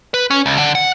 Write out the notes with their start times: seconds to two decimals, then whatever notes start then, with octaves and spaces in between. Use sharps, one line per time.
0.14 B4
0.30 C#4
0.46 C#2
0.59 D3
0.75 F#5